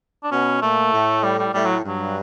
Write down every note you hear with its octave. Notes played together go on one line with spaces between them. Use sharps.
D4
B2 C#4
A#2 A3
A2
G3
G3
A2 G3
F#3
G2 F#3